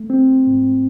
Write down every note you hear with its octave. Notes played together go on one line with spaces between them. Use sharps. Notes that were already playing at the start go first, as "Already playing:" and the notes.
Already playing: A3
C4
G#2